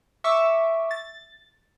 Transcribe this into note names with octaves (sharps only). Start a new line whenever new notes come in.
E5 C#6 D6 E6
A6